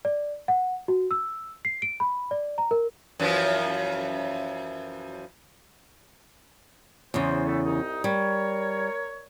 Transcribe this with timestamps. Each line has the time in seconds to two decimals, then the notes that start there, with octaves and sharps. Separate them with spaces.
0.05 D5
0.48 F#5
0.88 F#4
1.11 E6
1.65 C7
1.82 D7
2.00 B5
2.31 D5
2.58 A#5
2.71 A#4
3.20 F#2 E3 F3
7.14 E2 C#3 C5
7.46 A2 A3
7.65 C2 D#4
8.04 G3 A#4 C#5